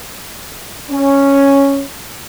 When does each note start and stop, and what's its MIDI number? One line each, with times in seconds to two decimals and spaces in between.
0.90 1.82 61